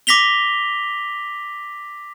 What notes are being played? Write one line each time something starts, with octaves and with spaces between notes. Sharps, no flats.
D6 A#6 B6 F7 G7